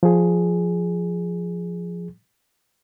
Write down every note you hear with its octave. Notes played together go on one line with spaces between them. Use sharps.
F3 G#4